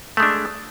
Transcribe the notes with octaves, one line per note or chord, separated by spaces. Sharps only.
G#3 A3 D4